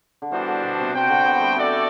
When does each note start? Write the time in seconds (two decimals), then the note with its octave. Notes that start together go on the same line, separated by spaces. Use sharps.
0.22 D3
0.32 E3 G3 B3 D4 F#4 C5
0.47 D3
0.63 B2
0.79 C3
0.94 C3 F#4 C5 G5
1.09 D3
1.25 B3
1.36 G3 A3
1.56 A3 F#4 A4 D5